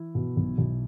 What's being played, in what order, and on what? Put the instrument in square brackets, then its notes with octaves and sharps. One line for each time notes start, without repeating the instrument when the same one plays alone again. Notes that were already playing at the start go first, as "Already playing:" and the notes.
Already playing: [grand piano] E3 E4
B2
B1
B1